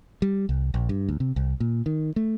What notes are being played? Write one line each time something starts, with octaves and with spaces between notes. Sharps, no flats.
G3
C2
A#1
G2
D2
C3
C2
A#2
D#3
A3